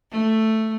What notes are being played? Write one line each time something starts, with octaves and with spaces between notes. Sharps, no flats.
A3